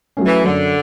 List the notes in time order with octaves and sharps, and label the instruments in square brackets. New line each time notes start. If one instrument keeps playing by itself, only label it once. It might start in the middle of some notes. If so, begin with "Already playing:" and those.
[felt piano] F#3 A3 C#4
[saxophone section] E3
[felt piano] F#2 [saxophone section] D3